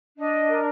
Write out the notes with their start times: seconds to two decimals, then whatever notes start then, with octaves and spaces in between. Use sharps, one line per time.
0.18 D4 D#5
0.48 A#4